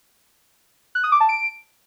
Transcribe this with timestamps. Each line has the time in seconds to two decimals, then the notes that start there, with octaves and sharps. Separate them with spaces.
0.95 F#6
1.04 D#6
1.12 D6
1.20 A5
1.29 D7